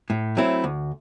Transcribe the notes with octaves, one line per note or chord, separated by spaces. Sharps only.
A2
F#3 A3 C4 E4
D2